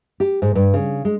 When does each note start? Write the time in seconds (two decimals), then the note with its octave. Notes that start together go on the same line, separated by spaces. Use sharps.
0.20 G4
0.42 G#2
0.55 G2
0.74 C#3
1.05 G#3